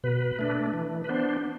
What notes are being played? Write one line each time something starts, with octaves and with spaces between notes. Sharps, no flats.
B2 B4
A3 D4
E3
B4
B3 D4 C5